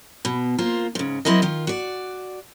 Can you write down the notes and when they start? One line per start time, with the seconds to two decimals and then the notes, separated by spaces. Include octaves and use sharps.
0.25 B2
0.58 A#3 F4 C5
0.95 G#2 C#3
1.25 F#3 C4 E4 A#4 D#5
1.42 D#3 F4
1.67 F#4 D5